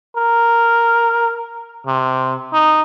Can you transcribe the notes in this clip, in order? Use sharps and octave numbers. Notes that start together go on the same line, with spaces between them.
A#4
C3
D#4